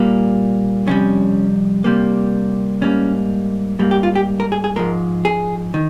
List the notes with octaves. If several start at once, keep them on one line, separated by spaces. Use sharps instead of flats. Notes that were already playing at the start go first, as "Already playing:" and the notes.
Already playing: A#2 G3 A#3
F2 C3 G3 C#4
C3 G3 A#3
G#2 G3 A#3 C#4
G#2 G3 A#3
G4
F4
G4
A#4
G#4
G#4
G#2 F3 G#3 A#4
G#4
D#3